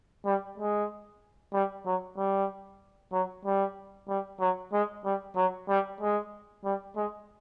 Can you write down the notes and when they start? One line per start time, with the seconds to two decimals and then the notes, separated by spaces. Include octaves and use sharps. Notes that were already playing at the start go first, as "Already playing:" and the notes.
0.26 G3
0.58 G#3
1.54 G3
1.86 F#3
2.18 G3
3.13 F#3
3.45 G3
4.09 G3
4.40 F#3
4.73 G#3
5.05 G3
5.37 F#3
5.69 G3
6.01 G#3
6.65 G3
6.96 G#3